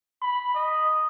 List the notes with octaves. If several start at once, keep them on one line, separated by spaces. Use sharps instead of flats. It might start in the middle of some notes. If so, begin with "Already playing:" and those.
B5
D#5